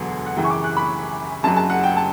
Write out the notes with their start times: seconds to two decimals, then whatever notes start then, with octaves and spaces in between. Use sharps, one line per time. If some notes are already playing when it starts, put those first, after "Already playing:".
Already playing: E1 D2 D3 F#3 B3
0.26 F#5
0.37 F#2 C#3 E3 G5
0.44 C#6
0.50 D6
0.64 F#6
0.77 B5
1.43 F#1 F#2 C#3 F#3 A5
1.57 A5
1.70 F#5
1.84 G5
1.97 A5